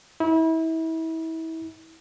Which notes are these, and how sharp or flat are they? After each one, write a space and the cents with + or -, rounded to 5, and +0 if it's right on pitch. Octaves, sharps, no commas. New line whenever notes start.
E4 -30